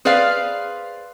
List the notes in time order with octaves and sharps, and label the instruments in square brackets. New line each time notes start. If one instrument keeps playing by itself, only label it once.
[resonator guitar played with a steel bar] G#4 B4 C5 D5 F5